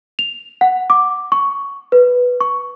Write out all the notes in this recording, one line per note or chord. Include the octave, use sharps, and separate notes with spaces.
F7
F#5
D6
C#6
B4
C#6